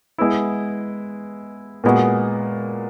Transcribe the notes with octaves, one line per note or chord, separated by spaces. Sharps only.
G#3 B3 E4
A#2 G#3 B3 F#4